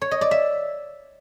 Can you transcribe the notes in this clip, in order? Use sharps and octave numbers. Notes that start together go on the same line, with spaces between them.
C#5
D#5
D5
E5